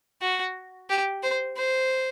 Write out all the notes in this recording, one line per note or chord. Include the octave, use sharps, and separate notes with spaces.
F#4
G4
C5
C5